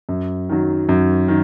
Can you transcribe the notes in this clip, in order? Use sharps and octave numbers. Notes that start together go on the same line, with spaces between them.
F#2
D#3 F#3
F#2
D#3